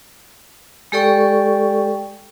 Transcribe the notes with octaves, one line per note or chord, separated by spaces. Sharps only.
G#3 G4 A4 D5 G5 C#6